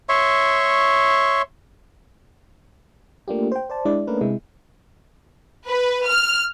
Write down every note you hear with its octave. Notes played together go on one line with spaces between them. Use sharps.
C#5 E5 C6 C#6
A3 A#3 D4 F4 G4
C5 G5
C5 D5 A5
G#3 D4 E4 D5
A3 A#3 C#4 D4 A#4 B4
C3 G#3 E4
B4
F6